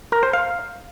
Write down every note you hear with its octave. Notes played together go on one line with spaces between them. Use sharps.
A#4
C5
F5